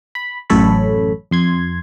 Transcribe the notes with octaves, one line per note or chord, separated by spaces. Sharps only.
B5
A1 F#2 A4 C#5 B5
F2 C6 G#6